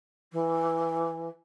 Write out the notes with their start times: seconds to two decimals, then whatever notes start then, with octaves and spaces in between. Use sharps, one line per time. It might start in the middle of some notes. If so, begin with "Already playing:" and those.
0.32 E3